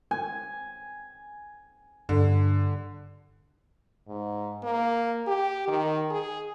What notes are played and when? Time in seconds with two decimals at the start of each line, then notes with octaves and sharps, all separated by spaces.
0.11 G#5
2.09 G2 D3
4.08 G#2
4.63 A#3
5.27 G4
5.68 D#3
6.11 G#4